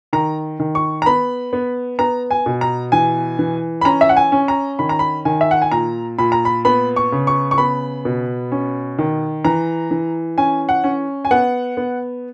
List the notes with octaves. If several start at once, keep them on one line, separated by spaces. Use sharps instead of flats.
D#3 A#5
D#3
C#6
A#5
B3 B5
B3
B3 A#5
G#5
B2
A#5
E3 G#5
E3
B5
C#4 A#5
E5
F#5
G#5
C#4
A#5
D#3 B5
A#5
B5
D#3 G#5
E5
F#5
G#5
A#2 A#5
A#2 B5
A#5
B5
B3 B5
C#6
C#3
C#6
C#6
B3 B5
B2
C#4
D#3
E3 A#5
E3
C#4 G#5
F#5
C#4
G#5
B3 F#5
B3